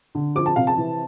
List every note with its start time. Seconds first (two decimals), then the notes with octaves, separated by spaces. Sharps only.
0.15 D3
0.35 F3 D6
0.46 A5
0.56 C3 F5
0.67 A5
0.77 E3